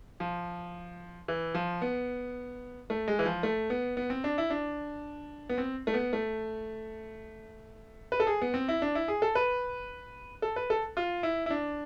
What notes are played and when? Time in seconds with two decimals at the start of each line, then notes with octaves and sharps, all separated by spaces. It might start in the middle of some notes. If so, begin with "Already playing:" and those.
0.20 F3
1.28 E3
1.55 F3
1.82 B3
2.90 A3
3.08 G#3
3.19 E3
3.25 F3
3.43 A3
3.70 B3
3.97 B3
4.10 C4
4.24 D4
4.38 E4
4.50 D4
5.49 B3
5.58 C4
5.87 A3
5.94 B3
6.13 A3
8.12 B4
8.20 A4
8.27 G#4
8.42 B3
8.54 C4
8.68 E4
8.82 D4
8.95 E4
9.08 G#4
9.22 A4
9.35 B4
10.42 A4
10.56 B4
10.70 A4
10.97 F4
11.23 E4
11.46 E4
11.51 D4